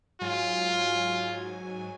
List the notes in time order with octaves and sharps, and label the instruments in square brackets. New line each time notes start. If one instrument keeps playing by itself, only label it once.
[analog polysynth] G#2 F#3 G#5 [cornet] F4